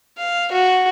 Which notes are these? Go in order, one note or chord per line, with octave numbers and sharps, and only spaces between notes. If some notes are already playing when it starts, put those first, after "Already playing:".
F5
F#4